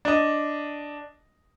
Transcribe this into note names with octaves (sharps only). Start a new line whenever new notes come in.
D4 D#5